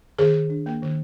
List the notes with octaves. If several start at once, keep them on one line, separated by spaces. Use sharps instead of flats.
D#3 G#4
D#3
D4
A#3
D#3